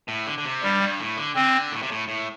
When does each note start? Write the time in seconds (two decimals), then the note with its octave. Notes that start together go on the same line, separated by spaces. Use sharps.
0.08 A2
0.27 D3
0.38 D3
0.45 C3
0.63 G2 G3
0.81 G2
1.00 A2
1.17 D3
1.35 D3 C4
1.71 A2
1.83 C3
1.91 A2
2.08 A2